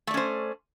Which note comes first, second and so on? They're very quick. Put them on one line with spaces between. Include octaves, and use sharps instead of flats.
A3 D5 C#4 C5